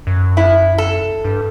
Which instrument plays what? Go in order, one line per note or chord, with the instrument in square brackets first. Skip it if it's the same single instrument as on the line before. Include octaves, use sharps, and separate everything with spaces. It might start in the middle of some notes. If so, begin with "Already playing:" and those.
[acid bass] F#2
[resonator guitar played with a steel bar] E4
A4
[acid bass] G2